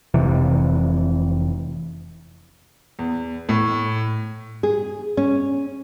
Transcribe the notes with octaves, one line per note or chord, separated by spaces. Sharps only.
F1 C3 E3
E2
A2
G#4
C#4